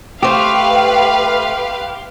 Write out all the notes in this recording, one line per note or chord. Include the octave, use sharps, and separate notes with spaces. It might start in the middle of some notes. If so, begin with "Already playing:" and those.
A3 G4 B4 C5 F5